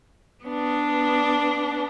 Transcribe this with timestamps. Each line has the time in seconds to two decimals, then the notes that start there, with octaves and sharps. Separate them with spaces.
0.43 B3 D4